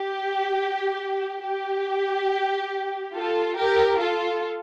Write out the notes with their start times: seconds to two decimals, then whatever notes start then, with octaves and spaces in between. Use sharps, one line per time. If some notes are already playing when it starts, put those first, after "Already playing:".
Already playing: G4
1.43 G4
3.14 F4 A4
3.57 G4 A#4
3.99 F4 A4